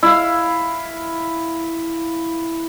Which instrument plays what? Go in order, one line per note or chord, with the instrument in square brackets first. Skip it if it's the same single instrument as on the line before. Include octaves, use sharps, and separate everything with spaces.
[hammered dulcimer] E4 F5